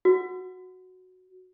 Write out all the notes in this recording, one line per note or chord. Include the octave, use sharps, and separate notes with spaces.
F#4